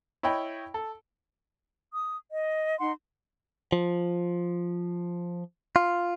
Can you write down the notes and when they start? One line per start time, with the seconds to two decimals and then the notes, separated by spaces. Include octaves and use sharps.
0.23 E4 C#5 D#5 G5 B5
0.74 A4
1.92 D#6
2.31 D#5
2.80 D#4 F#5 C6
3.72 F3
5.76 F4